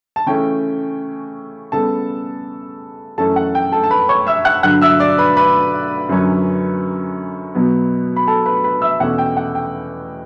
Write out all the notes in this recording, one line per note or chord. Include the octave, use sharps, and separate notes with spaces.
A5
C#3 E3 A3 C#4 G5
C#3 G3 B3 A4 A5
F#2 E3 A3 C#4 A4 A5
F#5
G5
A4 A5
A5
B4 B5
C#5 C#6
E5 E6
F#5 F#6
G2 D3 F#3 F#5 F#6
E5 E6
D5 D6
B4 B5
B4 B5
F#2 D3 F#3 C#4
B2 F#3 B3
B5
A4 A5
B4 B5
B4 B5
E5 E6
E2 B2 A3 C#4 F#5
G5
F#5
G5